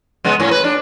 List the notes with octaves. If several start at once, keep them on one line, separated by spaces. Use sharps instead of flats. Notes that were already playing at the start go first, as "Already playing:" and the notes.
C#3 G#3 B3
A2 C#4
B4
D4